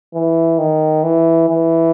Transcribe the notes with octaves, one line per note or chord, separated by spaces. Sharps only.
E3
D#3
E3
E3